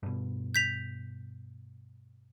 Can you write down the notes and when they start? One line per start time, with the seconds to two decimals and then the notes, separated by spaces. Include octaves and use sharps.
0.03 G2 B2
0.55 G6 B6 F7